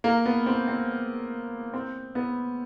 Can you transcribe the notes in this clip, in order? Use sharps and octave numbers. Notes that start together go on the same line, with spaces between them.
A#3
B3
C4
C4
C4
B3